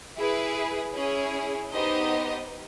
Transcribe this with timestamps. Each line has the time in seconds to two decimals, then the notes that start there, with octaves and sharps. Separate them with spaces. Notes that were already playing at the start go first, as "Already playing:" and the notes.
0.17 E4 G#4 B4
0.94 C#4 E4 G#4
1.72 B3 D#4 G4 C5 D#5